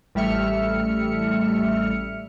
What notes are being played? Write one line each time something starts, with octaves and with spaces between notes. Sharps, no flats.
A1 G3 A3 E5 F6 C#7